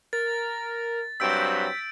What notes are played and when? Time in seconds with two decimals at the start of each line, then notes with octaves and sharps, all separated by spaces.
0.13 A#4 A6
1.20 G2 F#3 C4 E6 G6 B6 D7